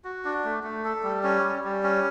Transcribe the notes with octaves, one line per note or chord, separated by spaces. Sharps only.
F#4
D4
A3
A3
A4
G3
C#4
G3
G3
C#4